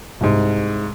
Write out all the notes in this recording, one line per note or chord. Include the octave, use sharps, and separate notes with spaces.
C2 G#2